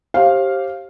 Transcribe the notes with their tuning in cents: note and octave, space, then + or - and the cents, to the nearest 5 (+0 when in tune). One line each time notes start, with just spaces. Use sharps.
G4 -10 C5 +35 F5 +0